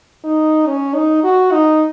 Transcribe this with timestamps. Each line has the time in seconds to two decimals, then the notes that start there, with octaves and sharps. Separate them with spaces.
0.24 D#4
0.67 C#4
0.95 D#4
1.24 F#4
1.52 D#4